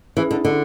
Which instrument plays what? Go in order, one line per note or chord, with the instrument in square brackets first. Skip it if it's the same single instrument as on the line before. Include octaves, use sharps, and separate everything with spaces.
[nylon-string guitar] E3 [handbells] C#4 E4 G#4
[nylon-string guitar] D3
D3